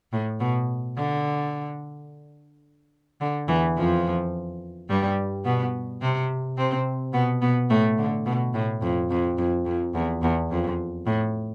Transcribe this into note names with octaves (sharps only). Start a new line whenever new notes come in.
A2
B2
D3
D3
E2 E3
F2 F3
G2 G3
B2 B3
C3 C4
C3 C4
B2 B3
B2 B3
A2 A3
D3
B2
A2
F2
F2
F2
F2
E2
E2
F2
A2